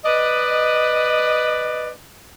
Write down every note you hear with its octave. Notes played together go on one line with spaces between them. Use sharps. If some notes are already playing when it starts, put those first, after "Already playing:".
B4 D5 D#5